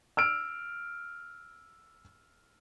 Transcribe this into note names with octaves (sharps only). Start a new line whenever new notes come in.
E6 F6 D7